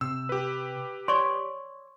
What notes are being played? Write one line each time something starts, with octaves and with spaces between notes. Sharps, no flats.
C3 E6
G4 B4
C#5 D5 C6 C#6